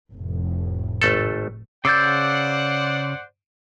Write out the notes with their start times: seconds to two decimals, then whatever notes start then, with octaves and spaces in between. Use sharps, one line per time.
0.12 F1 A2
1.02 G#1 A3 A4
1.85 C#3 C5 D5 F#5 D6 E6 G6 A6